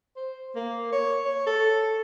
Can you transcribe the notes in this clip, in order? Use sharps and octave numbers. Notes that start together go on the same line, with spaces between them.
C5
A#3
C#5
C#5
A4